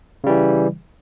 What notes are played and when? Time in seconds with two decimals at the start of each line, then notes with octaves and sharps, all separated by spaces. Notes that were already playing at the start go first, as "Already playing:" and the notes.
0.24 C#3
0.26 G3
0.29 E3